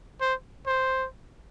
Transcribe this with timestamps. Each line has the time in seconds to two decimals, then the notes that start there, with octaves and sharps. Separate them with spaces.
0.21 C5
0.66 C5